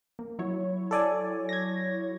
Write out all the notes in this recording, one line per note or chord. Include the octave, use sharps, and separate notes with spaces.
A#3
F#3 E4 C#5
A4 D5 G#5
G#6 A#6